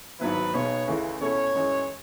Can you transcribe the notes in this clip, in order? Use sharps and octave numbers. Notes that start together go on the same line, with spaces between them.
G#1 G#2 F#3 B3 E4 B4
B1 B2 G#3 B3 C#5
C#2 C#3 E3 A3 E4
B2 A3 C#4 E4 A4 C#5
F#2 E3 G#3